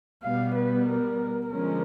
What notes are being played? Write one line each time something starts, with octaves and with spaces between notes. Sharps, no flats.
B2 G3 B3 F5
B4
A#4
D3 F3 G#3 C#4 A#4